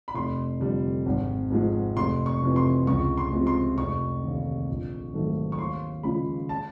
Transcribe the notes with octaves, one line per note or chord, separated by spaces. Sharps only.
B5
F1 C6
F2 D3 G3
G#1
G#2 F3 G#3
F1 C6
C#6
F2 C3 E3
C6
C#2 C#6
C6
C3 F3 G#3
C6
F1 C#6
D#2 D3
A#1
G#2 D#3 F#3 A3
C#6
D#2 C6
C#3 F3 G#3 B5
A5